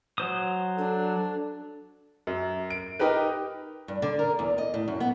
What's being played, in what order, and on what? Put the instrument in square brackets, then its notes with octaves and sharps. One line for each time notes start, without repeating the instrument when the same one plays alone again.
[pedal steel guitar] F#3 C5 D#6
[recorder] D4 [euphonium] A4
[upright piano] F#2
D7
D#4 G4 A#4 B4
[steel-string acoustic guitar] G2
D3
A#4
E2
D#5
A2
F#2
B3